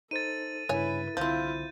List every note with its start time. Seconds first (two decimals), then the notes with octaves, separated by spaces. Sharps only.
0.11 D#4 A4 C5 A6 D#7
0.69 G2 C#3 E4 B4 C#5 G#5
1.17 C2 D3 F3 C4 E4 F4 G6